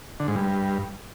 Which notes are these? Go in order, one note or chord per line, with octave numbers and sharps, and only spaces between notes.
D3
G#2
G2